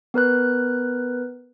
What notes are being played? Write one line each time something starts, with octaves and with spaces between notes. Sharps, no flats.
B3 A#4 B4 F#6